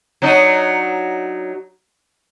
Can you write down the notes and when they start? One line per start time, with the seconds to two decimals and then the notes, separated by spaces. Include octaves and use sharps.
0.22 F#3 D4 D#4